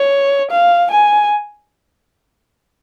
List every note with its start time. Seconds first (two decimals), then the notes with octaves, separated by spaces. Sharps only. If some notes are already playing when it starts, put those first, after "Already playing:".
Already playing: C#5
0.51 F5
0.91 G#5